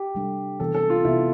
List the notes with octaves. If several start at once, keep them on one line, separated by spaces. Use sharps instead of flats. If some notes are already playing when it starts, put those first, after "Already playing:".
Already playing: G4
C3 G3 D4 A4
C3 E3 B3 A4
A4
F4
C3 E3 B3 E4